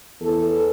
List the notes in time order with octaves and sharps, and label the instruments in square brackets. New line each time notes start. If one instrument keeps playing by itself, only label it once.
[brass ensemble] E2 E3 A4